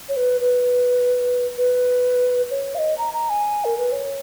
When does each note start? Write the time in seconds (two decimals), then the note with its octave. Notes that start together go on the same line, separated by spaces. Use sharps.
0.09 C#5
0.17 B4
0.41 B4
1.58 B4
2.51 C#5
2.75 F5
2.78 D#5
2.98 A#5
3.13 A#5
3.29 G#5
3.65 A#4
3.78 B4
3.92 C#5